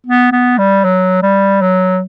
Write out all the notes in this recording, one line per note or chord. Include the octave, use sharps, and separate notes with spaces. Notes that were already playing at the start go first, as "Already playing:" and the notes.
B3
B3
G3
F#3
G3
F#3